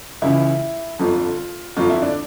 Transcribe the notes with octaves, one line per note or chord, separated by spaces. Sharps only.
C#2 C#3 E3 E4
G1 F2 D3 F4
G1 F2 D3 F4
E4
D4